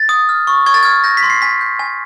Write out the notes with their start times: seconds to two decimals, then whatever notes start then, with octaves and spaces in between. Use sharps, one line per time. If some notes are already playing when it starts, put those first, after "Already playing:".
Already playing: A6
0.09 D#6
0.29 F6
0.47 C#6
0.66 C#6 G#6
0.74 A6
0.83 F6 G#6
1.04 G6 A#6
1.17 B6
1.23 C6
1.30 C7
1.42 G#5 B6
1.61 G6
1.79 G#5